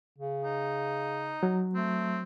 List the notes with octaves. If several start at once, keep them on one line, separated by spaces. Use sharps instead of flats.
C#3
D#4
F#3
A3 C4